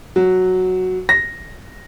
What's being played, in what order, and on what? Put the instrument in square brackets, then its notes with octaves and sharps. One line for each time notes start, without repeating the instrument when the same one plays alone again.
[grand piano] F#3
A#6